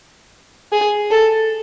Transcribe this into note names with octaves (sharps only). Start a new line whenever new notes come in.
G#4
A4